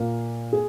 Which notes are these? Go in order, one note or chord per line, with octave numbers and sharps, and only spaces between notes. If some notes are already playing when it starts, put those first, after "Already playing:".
Already playing: A#2 A#3
G#4